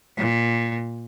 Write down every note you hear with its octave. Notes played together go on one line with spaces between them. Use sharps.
A#2